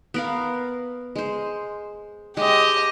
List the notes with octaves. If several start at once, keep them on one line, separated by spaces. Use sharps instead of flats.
B3 A#4 F5
G#3 C5
G#3 G4 D#5